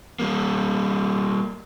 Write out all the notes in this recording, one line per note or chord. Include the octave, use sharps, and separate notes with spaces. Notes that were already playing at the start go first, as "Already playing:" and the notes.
G3 A#3